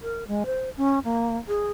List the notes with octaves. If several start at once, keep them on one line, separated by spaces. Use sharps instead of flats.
A#4
G#3
C5
C#4
A#3
G#4